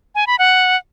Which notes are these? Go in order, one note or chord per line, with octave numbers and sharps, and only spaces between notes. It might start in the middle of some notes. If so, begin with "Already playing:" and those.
G#5
B5
F#5